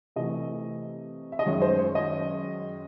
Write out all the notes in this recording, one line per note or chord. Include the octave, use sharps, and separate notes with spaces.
C3 E3 A3 D#5
E5
D#5
F#2 D#3 G#3 C#5
C5
C#5
D#5